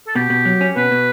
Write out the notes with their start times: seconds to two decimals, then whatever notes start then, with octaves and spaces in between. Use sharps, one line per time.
0.07 A4
0.15 B2 G4
0.30 B2
0.45 F#3
0.61 C#4
0.76 B2 B4
0.91 B2